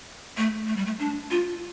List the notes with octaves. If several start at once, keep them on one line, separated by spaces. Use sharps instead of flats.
A3
A3
G3
A3
D4
F4